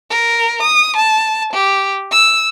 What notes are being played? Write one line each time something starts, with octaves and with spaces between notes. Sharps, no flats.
A#4
D#6
A5
G4
E6